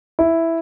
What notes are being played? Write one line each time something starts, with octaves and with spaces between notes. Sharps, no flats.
E4